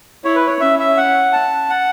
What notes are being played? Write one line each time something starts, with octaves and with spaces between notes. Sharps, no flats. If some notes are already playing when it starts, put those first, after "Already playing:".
E4 C#5
B4
C#5
C#4 E5
E5
F#5
A5
F#5